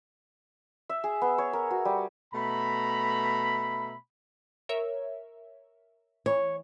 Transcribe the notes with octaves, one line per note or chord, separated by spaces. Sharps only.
E5
G#4
B3
C#5
A#4
F#4
G3
B2 A3 E5 A#5 B5
A#4 C#5 E5
E3 C#5